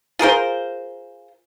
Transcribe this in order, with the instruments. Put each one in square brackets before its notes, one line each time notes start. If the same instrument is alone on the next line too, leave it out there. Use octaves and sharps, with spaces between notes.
[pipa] F4 G#4 A#4 C5